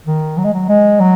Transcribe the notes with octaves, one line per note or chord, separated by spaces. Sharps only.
D#3
F#3
G#3
F#3
G#3
F#3